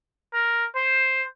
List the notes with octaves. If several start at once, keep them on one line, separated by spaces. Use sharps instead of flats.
A#4
C5